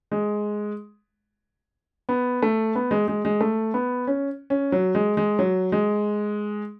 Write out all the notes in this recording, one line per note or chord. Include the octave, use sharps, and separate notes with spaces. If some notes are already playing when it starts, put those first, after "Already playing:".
G#3
B3
A3
B3
G#3
G#3
G#3
A3
B3
C#4
C#4
F#3
G#3
G#3
F#3
G#3